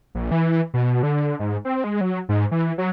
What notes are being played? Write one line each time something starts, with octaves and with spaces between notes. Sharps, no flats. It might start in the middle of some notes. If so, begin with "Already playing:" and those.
A#1
E3
B2
D3
G#2
C4
G#3
F#3
G#2
E3
F#3